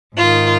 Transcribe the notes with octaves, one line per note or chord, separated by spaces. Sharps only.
G#2 D#3 F4